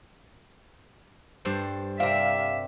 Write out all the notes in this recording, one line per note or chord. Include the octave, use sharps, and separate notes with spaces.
G2 G3 A4 C5
C3 C4 A#4 D5 E5 F5